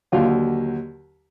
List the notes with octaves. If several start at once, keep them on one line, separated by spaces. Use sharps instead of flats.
D#2 D3 F#3 F4